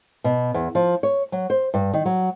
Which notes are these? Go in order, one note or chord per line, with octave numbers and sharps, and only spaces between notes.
B2
E2
F3
C#5
F#3
C5
G2
D#3
F#3